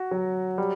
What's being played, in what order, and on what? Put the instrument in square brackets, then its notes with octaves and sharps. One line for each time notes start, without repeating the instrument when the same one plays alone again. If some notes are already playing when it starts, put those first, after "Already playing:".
Already playing: [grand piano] F#4
F#3
G3